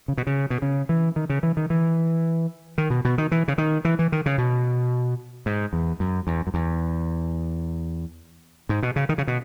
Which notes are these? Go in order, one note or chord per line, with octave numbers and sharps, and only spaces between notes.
C#3
B2
C#3
B2
C#3
E3
D#3
C#3
E3
D#3
E3
D#3
B2
B2
D#3
E3
C#3
D#3
E3
E3
D#3
C#3
B2
G#2
E2
F#2
E2
F#2
E2
G#2
B2
C#3
D#3
C#3
B2